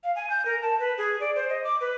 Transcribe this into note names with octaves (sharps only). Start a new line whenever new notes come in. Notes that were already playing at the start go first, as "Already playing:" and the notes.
F5
G#5
G6
A#4
A5
B4
G#4
D5
C5
D#5
D6
B4